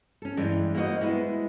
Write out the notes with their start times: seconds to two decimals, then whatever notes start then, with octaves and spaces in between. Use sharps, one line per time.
0.22 C#4 A4
0.37 G2 E3 G#3
0.75 A#3 B3 E4 F#4 C5 D#5
1.01 G#3 B3 E4